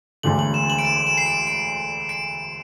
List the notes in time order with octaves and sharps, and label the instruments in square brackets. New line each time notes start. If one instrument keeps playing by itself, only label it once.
[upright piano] E1 D2 D3 A3 [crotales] F#7
[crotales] F#7
E7
F#7
D7
E7
E7
C7
D7
D7
D7